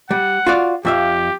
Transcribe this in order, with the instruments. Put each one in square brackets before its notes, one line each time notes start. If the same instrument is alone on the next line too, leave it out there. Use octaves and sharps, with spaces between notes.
[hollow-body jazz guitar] G3 [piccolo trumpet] F#5
[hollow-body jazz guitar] F4 F#4 D5
[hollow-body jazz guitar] F2 E5 F5 [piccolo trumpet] G4